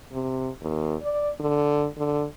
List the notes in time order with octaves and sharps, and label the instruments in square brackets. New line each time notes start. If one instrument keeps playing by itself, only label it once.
[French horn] C3
D#2
D5
D3
D3